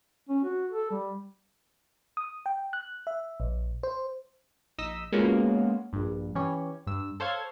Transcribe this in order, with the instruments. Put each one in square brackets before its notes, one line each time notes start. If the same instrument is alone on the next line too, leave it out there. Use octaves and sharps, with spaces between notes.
[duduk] C#4
F#4
A4
G3
[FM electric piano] D#6
G5
F#6
E5
A#1
C5
[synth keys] A#1 D#4 D#5 D#6 E6 B6
G#3 A#3 B3 C#4 F4 F#4
A#1 G2
E3 C#4 G4 C#5
G2 E6
A4 C5 C#5 F5 G#6